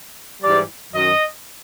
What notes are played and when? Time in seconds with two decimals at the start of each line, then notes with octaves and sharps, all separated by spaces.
0.43 G#2 E3 G3 D5
0.93 F#2 D#3 F#3 D#5